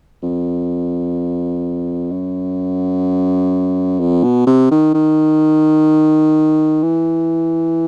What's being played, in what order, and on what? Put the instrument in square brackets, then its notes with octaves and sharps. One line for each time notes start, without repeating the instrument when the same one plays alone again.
[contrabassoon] F2
F#2
F2
B2
C3
D#3
D#3
E3